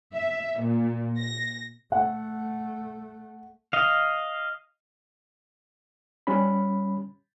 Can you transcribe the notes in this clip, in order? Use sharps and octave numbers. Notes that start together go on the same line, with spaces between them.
E5
A#2
A#6
A3 F#5
D#5 F5
G3 C#4 B5